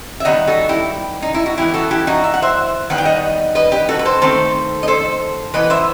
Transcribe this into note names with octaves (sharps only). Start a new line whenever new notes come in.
E5
D#3 G3 B3 D#5 F#5
F#4 A4
E4 G4
D#4
E4
F#4
E3 B3 E4 G4
F#4 A4
E4 G4
D#4 F#4
E5
F#5
C5 E5
D#3 G3 B3 F#5
G5
D#5 F#5
B4 D#5
G4 B4
F#4 A4
B4
A4 C5
D#3 A3 C4 A4 C5
D#5
A4 C5
E3 B3 B4 D#5
C5 E5